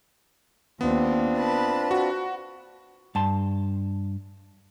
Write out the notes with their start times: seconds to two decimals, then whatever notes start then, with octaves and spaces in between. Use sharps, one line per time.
0.81 D#2 B3 C4 D4 F4
1.37 B4 A5 B5
1.91 F#4
3.15 G2 A5 C6